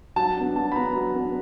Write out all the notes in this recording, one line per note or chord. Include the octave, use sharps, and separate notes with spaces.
F#3 A5
B3 D4
F#3 A5
B5
B3 D4 A#5
F#3
B3 D4